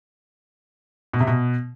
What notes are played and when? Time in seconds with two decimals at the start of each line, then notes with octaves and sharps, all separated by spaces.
1.13 B2
1.20 C3
1.27 B2